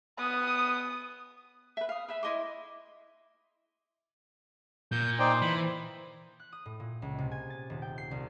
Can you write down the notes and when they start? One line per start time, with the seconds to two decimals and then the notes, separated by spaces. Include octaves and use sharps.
0.19 B3 D#6
1.77 B4 E5
1.89 F5 D#6
2.08 B4 E5 B5
2.23 E4 D#5 C6 D6
4.92 A#2 G6
5.19 D#4 C5 D5 G5
5.42 E3 B5
6.40 F#6
6.52 D#6
6.66 A2
6.80 A#2
7.02 C#2
7.19 C3
7.31 G#5
7.50 A6
7.70 D#1
7.82 G5
7.98 C7
8.11 C2